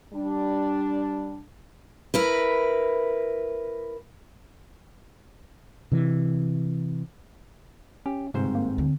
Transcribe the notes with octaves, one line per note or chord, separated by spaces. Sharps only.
G3 D4
E4 A#4 B4
C3 E3
C#4 G4
G1 G#2 C3 C4 C5
A#3
D2 D3